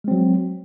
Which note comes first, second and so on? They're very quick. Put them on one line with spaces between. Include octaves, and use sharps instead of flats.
G#3 C4 F#3